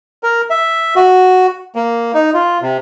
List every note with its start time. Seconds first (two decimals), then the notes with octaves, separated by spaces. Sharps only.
0.23 A#4
0.50 E5
0.96 F#4
1.75 A#3
2.14 D#4
2.34 F4
2.62 C3